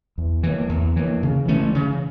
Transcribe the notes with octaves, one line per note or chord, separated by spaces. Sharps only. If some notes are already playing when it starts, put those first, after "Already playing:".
E2
E3 A#3
E2
E3 A#3
C#3
E3 A3 C#4
C#3